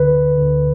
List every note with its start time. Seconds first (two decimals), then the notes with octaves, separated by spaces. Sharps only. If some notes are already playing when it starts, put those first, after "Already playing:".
Already playing: D2 D3 B4
0.38 D2 D3